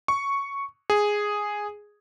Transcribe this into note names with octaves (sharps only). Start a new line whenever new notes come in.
C#6
G#4